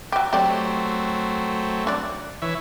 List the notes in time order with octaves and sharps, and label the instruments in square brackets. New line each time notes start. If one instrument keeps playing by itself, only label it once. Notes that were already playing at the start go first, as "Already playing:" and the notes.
[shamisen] F#3 G4
[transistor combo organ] F#3 A3 C4 [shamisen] G4 D5
[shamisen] D4 D5
[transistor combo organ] E3 C#5 E5